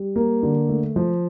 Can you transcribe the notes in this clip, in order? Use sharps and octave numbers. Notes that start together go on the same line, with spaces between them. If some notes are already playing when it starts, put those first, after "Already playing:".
Already playing: G3
A#3
D3
A3
F3